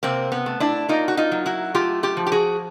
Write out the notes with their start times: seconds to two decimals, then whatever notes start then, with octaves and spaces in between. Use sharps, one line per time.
0.03 C3 A#3 C4
0.32 B3
0.46 A3
0.60 D4 E4
0.89 A#3 D#4 F4
1.08 F#4
1.17 D#4 F4
1.32 F#3
1.46 E4 F#4
1.75 A3 F4 G4
2.03 F4 G4
2.17 F3
2.27 G4
2.32 F#4 G#4